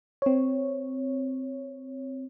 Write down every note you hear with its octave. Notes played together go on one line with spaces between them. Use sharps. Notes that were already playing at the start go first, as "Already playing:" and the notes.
C4 C#5